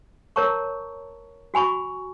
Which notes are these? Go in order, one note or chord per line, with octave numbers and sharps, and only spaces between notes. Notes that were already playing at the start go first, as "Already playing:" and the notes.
A#4 C#5 A5 A#5 C#6
F#4 G#5 B5 C#6